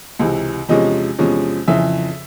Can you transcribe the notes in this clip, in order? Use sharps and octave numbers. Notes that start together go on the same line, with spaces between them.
C#2 C3 E3
E2 C3 F3 G#3 C#4 D#5
E2 C3 F3 G#3 C#4
F2 C#3 E3 E5